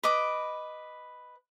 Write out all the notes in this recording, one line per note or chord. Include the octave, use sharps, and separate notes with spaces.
B4 D#5 D6